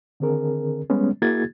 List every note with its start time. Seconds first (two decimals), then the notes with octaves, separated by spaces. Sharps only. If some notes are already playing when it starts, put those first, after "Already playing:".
0.20 D3 D#3 C4 G#4 A#4
0.90 G3 G#3 B3 C#4
1.22 A#3 E4 F#4 G#4 G#6 A6